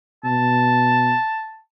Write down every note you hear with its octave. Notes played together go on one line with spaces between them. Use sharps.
B2 A5